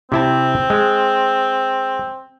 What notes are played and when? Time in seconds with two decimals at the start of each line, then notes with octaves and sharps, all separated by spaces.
0.12 C3 C4 E4 A5
0.70 G#3